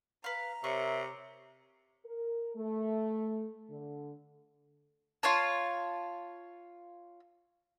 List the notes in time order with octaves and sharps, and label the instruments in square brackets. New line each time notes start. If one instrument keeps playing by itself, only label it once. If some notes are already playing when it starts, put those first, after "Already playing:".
[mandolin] B4 F5 [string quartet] A#5
[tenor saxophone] C3 [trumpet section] A#4 C#5 E5 [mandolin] C#6
[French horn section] A#4
A3
D3
[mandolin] F4 C#5 A5